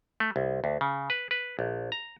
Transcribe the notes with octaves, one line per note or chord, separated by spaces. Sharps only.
A3
C2
D2
C#3
B4
B4
A#1
A#5